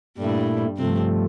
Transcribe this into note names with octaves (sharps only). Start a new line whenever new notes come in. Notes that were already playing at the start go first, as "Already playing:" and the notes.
G2 A#2 G3 A3 E4
G2 C3 F3 A3 C4